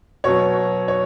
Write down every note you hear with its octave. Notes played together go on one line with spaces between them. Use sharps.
B2 F#3 C#5
C#5